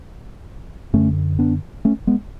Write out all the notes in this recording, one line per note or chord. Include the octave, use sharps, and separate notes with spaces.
F#2 D3 A3 C#4
B3 D4
A3 C#4
G#3 B3